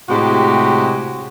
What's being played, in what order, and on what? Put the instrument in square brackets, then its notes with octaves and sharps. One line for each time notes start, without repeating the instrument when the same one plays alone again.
[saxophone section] A2 C3 G#3 F#4 G4